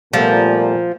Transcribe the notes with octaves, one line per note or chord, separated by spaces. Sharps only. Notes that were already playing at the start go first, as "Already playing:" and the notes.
A#2 F3 G3 A3 B3